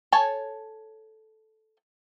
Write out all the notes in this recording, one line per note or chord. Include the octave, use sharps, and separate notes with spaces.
A4 C#5 G#5 A5